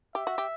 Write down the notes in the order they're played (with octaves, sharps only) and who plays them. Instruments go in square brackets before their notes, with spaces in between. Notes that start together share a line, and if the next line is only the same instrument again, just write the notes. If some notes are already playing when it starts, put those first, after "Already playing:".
[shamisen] G4 [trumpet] E5
[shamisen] F#4
G4